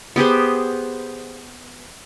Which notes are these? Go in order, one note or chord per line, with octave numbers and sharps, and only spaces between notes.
B3 G4 G#4 C5